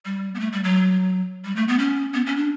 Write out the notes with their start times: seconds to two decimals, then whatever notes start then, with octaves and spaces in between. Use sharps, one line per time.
0.05 G3
0.35 B3
0.40 A3
0.53 G3
0.64 F#3
1.45 G3
1.56 A3
1.68 B3
1.79 C#4
2.14 B3
2.26 C#4
2.37 D4